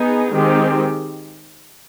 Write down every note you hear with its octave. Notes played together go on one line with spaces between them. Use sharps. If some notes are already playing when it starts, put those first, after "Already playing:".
Already playing: B3 D#4 G#4
D#3 G#3 C4 G4